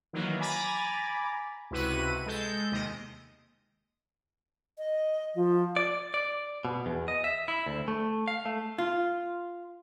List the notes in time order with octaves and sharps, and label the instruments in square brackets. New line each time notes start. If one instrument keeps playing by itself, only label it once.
[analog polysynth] D#3 E3 F#3 A#3
G#5 A#5 B5 D6 A6
C#2 C3 E4 F#4 B4 D#7
G#3 A4 G6
D#2 C3 D#5
[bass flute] D#5
F3
[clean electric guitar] D5
D5
B2
E2
D#5
E5
E4
D2
A3
F5
A3
[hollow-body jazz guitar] F4